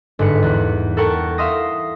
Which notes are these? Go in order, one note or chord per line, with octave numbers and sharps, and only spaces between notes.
G1 G#2 B4 C#7
E2 F#6
A4 A#4 F#5 G5 C#6
E5 F5 C6 D#6 A#6